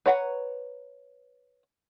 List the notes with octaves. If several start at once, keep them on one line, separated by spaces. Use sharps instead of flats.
B4 C#5 F#5 A#5